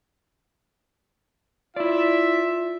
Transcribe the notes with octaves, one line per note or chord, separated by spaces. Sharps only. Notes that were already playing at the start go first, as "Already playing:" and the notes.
E4 F4 D5 E5